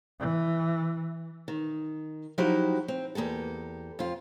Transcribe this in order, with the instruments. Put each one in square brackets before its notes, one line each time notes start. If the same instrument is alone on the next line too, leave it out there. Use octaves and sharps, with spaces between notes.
[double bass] E3
[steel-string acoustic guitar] D#3
F3 F#3 D#4 E4 F#4 G4
C4
E2 A#3 G4 A4
F2 F4